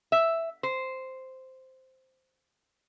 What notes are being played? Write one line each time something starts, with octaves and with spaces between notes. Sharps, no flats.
E5
C5